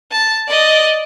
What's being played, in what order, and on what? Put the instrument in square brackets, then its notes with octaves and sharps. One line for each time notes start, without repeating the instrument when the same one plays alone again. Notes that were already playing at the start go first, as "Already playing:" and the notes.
[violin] A5
D5 D#5